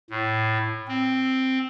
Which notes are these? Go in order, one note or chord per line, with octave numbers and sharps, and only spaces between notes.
A2
C4